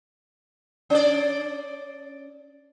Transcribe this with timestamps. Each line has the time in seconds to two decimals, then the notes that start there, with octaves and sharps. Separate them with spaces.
0.90 C#4 D5